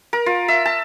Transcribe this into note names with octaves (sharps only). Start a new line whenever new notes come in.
A#4
F4
E5
A5